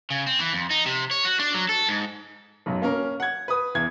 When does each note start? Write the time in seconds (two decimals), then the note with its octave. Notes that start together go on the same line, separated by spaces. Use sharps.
0.10 C#3
0.27 C4
0.40 E3
0.53 F2
0.71 D#4
0.86 C3
1.11 C#5
1.25 F#4
1.39 D4
1.54 F#3
1.69 A4
1.88 G#2
2.66 B1 F#2
2.82 A#3 C#4 A#4
3.20 F#5 G#6
3.48 B4 D#6
3.75 E2 G#6